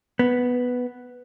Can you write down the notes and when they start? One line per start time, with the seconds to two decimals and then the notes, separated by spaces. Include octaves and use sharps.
0.19 B3